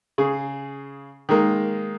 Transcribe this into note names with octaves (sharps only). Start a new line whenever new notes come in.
C#3 G#4
D#3 G#3 A#3